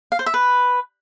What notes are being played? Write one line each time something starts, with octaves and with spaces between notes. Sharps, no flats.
F5
C5
E5
B4